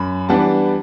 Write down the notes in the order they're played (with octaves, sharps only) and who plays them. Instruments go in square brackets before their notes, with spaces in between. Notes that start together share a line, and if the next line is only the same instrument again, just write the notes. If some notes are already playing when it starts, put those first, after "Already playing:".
Already playing: [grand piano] F#2 B5
E3 G3 B3 D4 F#5 A5